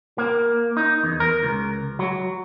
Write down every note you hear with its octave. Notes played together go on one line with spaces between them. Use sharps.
A#3
D#4
E2
A#4
C#2
F#3